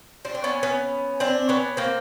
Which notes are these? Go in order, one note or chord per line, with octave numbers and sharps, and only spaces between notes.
C4 D4
C4
B3 C#4
B3 C#4
C4 D4
B3 C#4
A#3 C4